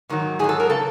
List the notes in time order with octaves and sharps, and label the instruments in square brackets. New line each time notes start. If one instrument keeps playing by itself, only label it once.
[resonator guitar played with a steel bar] G#2 D#3 F#3
G#2 D#3 F#3 G#4
A4
A#4
C#3 A4